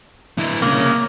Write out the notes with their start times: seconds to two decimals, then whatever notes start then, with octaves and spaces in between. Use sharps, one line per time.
0.38 D3 E4
0.62 C2 C#3 A#3